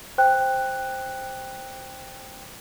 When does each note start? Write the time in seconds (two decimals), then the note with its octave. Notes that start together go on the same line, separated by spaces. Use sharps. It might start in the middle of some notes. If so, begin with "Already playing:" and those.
0.18 C5 G5 F#6